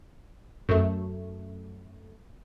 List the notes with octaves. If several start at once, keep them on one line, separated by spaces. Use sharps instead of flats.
F#2 A3